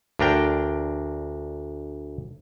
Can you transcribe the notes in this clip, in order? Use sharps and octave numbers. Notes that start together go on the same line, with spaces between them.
D2 D4 A#4 G5